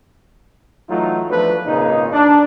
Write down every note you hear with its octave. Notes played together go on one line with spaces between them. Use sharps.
E3 F#3 A3 D#4 F4
E2 F3 F#3 A3 D4 B4
G#1 A#2 C#3 D#4
D4